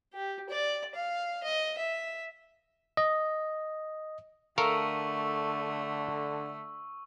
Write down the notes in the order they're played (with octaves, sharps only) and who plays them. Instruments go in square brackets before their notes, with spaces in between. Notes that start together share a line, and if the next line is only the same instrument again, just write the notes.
[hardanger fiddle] G4
D5
F5
D#5
E5
[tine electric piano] D#5
[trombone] D3 [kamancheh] A3 [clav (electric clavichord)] A4 A#4 F5 [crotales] C#6 E6